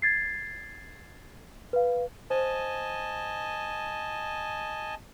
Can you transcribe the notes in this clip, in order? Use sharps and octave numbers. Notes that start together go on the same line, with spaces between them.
G#6 A6 C7
B4 F5
C5 D#5 G#5 A5